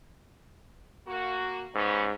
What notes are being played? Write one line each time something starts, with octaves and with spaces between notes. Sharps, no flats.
A#3 F#4
G#2 G3 B3 C#4